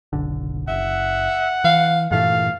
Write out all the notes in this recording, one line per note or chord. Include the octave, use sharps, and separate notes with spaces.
F#1 B1 D3
F#1 E5 F#5
E3 F5
G2 A#2 E3 A3 F5